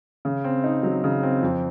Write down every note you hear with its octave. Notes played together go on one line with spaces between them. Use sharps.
C#3
C4
D#4
F#3
C#3
C4
F2